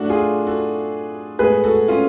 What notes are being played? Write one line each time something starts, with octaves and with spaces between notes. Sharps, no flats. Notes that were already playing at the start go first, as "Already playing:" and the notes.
Already playing: A2 F#3 A3 D4 F#4
F4 G#4
F#4 A4
A2 G#3 B3 G#4 B4
F#4 A4
C#4 F4